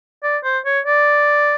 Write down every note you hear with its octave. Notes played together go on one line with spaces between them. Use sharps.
D5
C5
C#5
D5